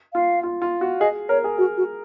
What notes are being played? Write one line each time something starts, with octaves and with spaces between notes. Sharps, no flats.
F4 F5
F4
F4
F#4
G#4 D#5
A#4 C#5
G#4
F#4 G#4
F#4